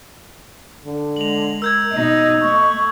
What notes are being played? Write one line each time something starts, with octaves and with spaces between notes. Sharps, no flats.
D3
G#3 F7 F#7
A#4 E6 G6 G#6
B2 D#4 D#5
A3 C#6